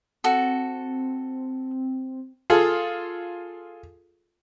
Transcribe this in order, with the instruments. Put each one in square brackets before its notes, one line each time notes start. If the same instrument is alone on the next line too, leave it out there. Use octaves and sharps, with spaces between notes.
[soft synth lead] C4 [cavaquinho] F#4 A4
[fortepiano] F4 G#4 A4